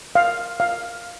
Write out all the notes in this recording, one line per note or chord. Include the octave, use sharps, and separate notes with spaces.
F5
F5